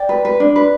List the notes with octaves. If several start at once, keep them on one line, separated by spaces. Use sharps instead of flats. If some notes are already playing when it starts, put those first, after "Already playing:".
Already playing: D5 G5
B4
B4
D4
B4